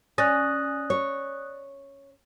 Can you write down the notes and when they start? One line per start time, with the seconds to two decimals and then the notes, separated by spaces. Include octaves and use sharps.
0.18 C#4 D5 D#6 F#6 A6 A#6
0.90 C#5